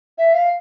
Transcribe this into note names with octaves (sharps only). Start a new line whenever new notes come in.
E5
F5